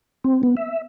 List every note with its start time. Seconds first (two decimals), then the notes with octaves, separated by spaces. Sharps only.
0.24 C4
0.43 B3
0.57 E5